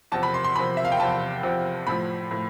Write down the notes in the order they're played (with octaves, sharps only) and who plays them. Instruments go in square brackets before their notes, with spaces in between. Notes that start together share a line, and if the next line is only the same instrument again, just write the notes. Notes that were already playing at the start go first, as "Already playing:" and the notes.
[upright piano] E2 C3 F3 A5
B5
C6
C6
E2 C3 F3 B5
E5
F5
G5
E2 C3 F3 A5
E2 C3 F3
A2 F3 B5
A2 F3